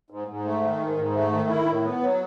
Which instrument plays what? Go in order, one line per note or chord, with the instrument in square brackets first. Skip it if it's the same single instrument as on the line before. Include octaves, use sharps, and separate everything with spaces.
[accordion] G#2
G#2
A3
D#3
G#2
G#2
A3
D#3
E4
A2
B3
F#3